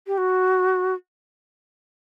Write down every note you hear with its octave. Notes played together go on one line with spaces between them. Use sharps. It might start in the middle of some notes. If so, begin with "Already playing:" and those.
G4
F#4